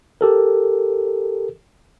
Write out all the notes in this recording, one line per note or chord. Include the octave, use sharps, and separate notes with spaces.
G4 A4 A#4